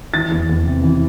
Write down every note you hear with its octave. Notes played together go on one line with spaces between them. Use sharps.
E3 A6
E2
E2
C3
E3